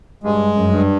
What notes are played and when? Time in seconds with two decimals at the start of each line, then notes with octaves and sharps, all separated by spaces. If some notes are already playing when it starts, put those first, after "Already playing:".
0.24 G2 G#3
0.55 F#2
0.70 G2